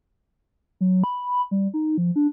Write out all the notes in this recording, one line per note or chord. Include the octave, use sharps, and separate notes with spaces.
F#3
B5
G3
D#4
F3
D4